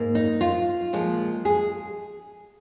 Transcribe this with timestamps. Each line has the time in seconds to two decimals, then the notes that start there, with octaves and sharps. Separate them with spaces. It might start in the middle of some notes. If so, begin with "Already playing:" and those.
Already playing: G#2 A#3
0.15 D#4
0.41 F4
0.93 A#2 F3 G#3
1.45 G#4